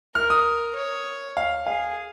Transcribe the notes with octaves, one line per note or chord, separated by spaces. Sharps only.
A#4 F6
D#6
C#5
F5
G#4 F5